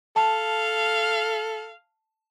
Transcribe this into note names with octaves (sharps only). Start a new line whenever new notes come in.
A4 F5 A5